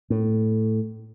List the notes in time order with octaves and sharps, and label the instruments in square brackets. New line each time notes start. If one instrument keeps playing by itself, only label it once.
[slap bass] A2